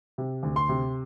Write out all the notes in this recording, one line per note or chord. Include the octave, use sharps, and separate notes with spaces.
C3
D2
C6
C3